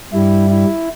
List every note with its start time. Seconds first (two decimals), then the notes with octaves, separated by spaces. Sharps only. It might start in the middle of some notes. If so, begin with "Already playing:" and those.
0.13 G2 G3 E4
0.50 E4